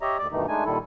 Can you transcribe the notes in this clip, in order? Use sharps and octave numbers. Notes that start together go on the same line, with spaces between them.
G4 C#5 D#5 E5 A#5
D2 D5 D6
G2 B2 D#3 E3 A3 D#4
G#3 A3 D4 D#4 G#5
A#2 D#3 G3 E4 A4